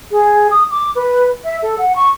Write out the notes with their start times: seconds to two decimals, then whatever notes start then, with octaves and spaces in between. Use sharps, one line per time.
0.11 G#4
0.50 D#6
0.71 D6
0.95 B4
1.44 E5
1.62 A4
1.78 F#5
1.95 C#6